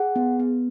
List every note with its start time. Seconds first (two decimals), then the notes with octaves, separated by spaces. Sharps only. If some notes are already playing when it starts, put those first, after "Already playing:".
Already playing: G#4 F#5
0.16 B3
0.40 B3